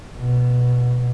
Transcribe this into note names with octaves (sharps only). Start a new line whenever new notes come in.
B2